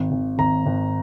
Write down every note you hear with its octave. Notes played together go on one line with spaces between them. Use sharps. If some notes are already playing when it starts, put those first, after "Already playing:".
Already playing: G#1
G#1
G#1 A#5
G#1